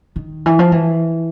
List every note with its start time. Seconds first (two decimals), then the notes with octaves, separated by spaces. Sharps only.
0.16 D#3
0.46 E3
0.59 F3
0.72 E3